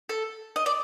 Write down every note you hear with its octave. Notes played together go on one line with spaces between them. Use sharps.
A4
D#5
D5